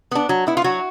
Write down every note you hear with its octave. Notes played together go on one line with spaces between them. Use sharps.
B3 D4
F#3
B3 E4
F4
F#3 F#4